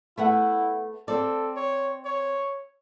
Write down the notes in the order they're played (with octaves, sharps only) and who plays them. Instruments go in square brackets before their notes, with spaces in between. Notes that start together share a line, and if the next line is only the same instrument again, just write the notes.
[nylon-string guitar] A3 B3 F#5 [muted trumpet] E4
[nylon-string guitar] C4 D5 [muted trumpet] A4
[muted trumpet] C#5
C#5